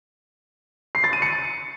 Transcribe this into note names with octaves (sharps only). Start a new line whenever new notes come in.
C7
A6
D#7
C#7